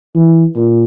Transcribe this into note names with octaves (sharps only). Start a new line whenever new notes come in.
E3
A#2